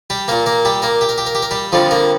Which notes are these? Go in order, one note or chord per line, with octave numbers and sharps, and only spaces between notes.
G3 G4
A#2 A#3 A#4
A#3 A#4
G3 G4
A#3 A#4
G4
A#4
G4
A#4
G4
A#4
G3 G4
F2 D3 F3 G3 F4
A#3 A#4